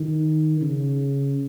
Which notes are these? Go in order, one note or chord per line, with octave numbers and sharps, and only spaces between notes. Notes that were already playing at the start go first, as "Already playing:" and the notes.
Already playing: D#3
C#3